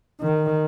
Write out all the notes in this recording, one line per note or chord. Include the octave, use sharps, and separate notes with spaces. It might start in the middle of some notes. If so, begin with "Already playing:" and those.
D#3